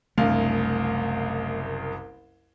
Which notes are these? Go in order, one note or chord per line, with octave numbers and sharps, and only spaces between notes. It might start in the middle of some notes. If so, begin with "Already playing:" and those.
F#1 C2 A3 D4 F5